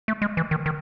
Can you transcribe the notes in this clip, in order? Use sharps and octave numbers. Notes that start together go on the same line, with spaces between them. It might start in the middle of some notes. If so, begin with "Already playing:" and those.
A3
G#3
E3
D#3
D#3